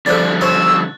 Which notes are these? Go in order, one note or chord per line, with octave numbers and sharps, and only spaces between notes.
D3 F3 G3 A4 C5 D5 F#6 A6
C#4 C5 C#5 E6